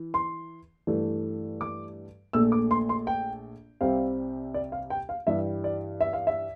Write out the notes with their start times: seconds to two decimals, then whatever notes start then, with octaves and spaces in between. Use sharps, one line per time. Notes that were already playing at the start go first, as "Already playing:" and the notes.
Already playing: E3
0.14 C6
0.87 G2 E3 A3
1.61 D6
2.33 A#1 A#2 A3 E6
2.52 D6
2.71 C6
2.89 C6
3.07 G5
3.81 C2 C3 G3 C4 F5
4.54 D5
4.72 F5
4.90 G5
5.09 F5
5.27 G2 E3 G3 E5
5.64 D5
6.01 E5
6.13 F5
6.27 E5